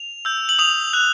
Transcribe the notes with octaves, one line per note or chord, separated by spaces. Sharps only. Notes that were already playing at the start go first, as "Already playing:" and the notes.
Already playing: F7
E6 G6
F#7
D#6 F7
F#6